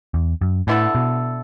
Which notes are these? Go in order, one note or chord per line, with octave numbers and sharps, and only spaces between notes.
E2
F#2
A2 D3 B3 E4 A4
B2